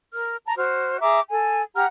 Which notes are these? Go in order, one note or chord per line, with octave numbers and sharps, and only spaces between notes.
A#4 F6
A5 A#5
F#4 C5 F6
G#4 E5 A#5 D6
A4 G#5
G4 F#5 A#5 F6